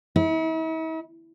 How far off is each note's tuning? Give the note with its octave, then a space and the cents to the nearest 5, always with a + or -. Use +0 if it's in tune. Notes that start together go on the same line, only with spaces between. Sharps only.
E4 -45